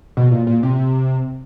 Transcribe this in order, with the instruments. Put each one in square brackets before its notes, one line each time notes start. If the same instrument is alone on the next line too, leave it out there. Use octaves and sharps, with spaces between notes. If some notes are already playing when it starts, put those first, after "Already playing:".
[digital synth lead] B2
A#2
A#2
C3